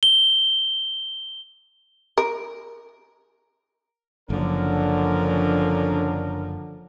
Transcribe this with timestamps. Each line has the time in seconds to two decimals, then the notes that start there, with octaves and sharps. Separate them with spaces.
0.03 G7
2.18 A#4
4.30 F#1 D3 F3 C#4 D4 A#4